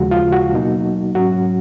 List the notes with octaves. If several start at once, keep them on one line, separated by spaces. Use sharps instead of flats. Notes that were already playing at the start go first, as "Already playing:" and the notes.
Already playing: D#2 C#3 F3 G#3 F#4
F4
F#4
B2 F#3 A#3 D#4
G#2 F#3 C#4 F#4